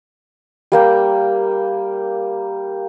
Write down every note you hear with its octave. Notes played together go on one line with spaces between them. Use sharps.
G3 A#3 G5